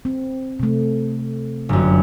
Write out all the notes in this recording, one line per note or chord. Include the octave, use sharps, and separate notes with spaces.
C4
C3 A3
G1 F#2